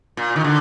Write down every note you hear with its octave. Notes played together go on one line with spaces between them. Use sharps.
A#2
D#3
D3